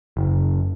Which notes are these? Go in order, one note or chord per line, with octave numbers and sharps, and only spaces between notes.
F#1